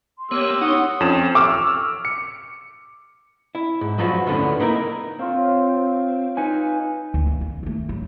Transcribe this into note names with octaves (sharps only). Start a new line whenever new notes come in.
C6
A#3 B3 G4 C#5 E6
D#4 C#5 F#5 D#6
F2 C#4 E7
C#6 D6 E6 F6
C#7
E4
G#2
G2 F3 F#3 B3 F4 F#4
D2 A2 D3 B3 C#4
A#3 B3 D#4 E4 A#4
C4 F4 C#5 F5
D#4 B4 G#5
D2
D#3
F2
D#3 A3
A1 F#3